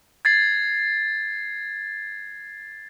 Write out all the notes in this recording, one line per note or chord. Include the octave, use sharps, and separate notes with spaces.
G#6 A6 C7